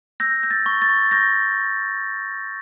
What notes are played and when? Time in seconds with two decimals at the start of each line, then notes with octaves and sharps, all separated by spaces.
0.20 E6 G6 A#6
0.43 G6
0.51 A6
0.66 C#6
0.82 A6
0.89 C#6
1.11 C#6 G6 A#6